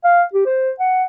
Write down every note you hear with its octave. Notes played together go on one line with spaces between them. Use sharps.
F5
G4
C5
F#5